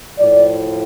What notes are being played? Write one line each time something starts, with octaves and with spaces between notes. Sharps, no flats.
A2 F3 D5